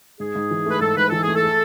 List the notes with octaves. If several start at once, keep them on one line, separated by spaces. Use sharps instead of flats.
G#2 G#4
G#2
E3
A3 B4
G#2 A4
G#2 B4
E3 A4
G#4
A3
A4
G#4